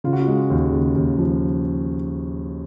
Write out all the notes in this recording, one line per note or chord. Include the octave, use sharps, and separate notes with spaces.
C#3 F4
F#4
F4
G#3
D#2
C#3
D#2
F3